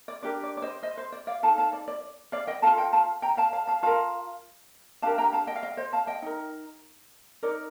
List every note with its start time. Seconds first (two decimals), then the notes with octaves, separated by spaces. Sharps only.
0.08 D5
0.22 D4 G4 A#4 D5
0.43 D5
0.57 D5
0.62 C5 D#5
0.83 C5 D#5
0.97 C5
1.12 D5
1.27 D5 F5
1.43 D#4 A4 F5 A5
1.58 F5 A5
1.73 D5
1.88 D5
2.32 D5 F5
2.47 D#5 G5
2.62 A4 F5 A5
2.67 F4
2.77 D#5 G5
2.93 F5 A5
3.22 G5 A#5
3.37 F5 A5
3.53 F5 A5
3.67 F5 A5
3.83 F4 A#4 F5 A5
5.02 D4 G4 A#4 F5 A5
5.18 G5 A#5
5.33 F5 A5
5.47 D#5 G5
5.56 F5
5.63 D#5 G5
5.77 C5 D#5
5.93 F5 A5
6.07 D#5 G5
6.22 D#4 A#4
7.43 D#4 A#4 D5